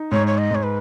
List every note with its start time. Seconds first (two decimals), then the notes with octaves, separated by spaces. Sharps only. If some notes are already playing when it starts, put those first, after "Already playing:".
Already playing: D#4
0.12 G#2 C#5
0.27 C#5
0.38 D#5
0.51 G#2 C#5
0.63 B4